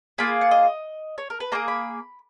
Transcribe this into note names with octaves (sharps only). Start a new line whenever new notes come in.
A#3 F4 G#4 B5
F#5
D#5
C#5
A#4
B4
A#3 F4 G#4 A#5
B5